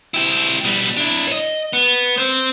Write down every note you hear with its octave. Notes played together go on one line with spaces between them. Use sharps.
E4 G4
B2 G3
D4 E4
C#5 D#5
B3
C4 C5